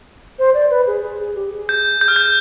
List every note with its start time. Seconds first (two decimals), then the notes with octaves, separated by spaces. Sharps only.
0.39 C5
0.54 D5
0.70 B4
0.87 G#4
1.03 G#4
1.20 G#4
1.35 G4
1.52 G#4
1.69 G6
2.01 G6
2.08 F6
2.16 G6